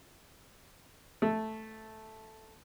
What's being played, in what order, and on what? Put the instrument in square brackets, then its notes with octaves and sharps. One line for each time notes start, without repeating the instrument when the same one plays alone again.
[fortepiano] A3